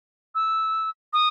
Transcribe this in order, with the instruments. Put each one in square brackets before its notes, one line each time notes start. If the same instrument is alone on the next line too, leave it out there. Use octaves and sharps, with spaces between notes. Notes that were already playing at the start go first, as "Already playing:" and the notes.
[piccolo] E6
D#6